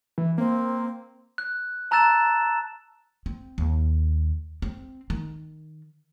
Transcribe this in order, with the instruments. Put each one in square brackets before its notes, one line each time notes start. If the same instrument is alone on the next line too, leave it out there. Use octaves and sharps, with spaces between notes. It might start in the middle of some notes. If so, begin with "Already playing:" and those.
[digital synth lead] E3
[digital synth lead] A#3 [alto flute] C4
[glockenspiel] F#6
A5 A#5 E6 F#6 A6 E7
[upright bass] C4
D#2
C4
D#3